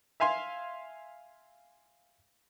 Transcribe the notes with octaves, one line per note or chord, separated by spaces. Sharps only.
E5 F5 G#5 C6